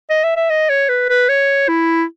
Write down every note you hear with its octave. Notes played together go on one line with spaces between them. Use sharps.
D#5
E5
E5
D#5
C#5
B4
B4
C#5
E4